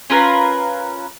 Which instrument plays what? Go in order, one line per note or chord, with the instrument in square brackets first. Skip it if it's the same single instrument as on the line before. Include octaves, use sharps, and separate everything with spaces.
[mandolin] C#4 F4 A#4 B4